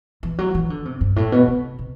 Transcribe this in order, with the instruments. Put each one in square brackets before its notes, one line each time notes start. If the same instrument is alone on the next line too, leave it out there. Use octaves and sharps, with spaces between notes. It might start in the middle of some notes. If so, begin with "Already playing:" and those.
[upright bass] E3
F#3
E3
D3
C3
G2
A2
B2
C3
C3